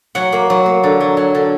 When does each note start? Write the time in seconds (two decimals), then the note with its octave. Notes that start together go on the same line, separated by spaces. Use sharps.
0.15 F#3 F#5
0.32 A#3
0.50 F#3
0.66 A#3
0.84 D3
1.00 F#3
1.17 F#3
1.35 D3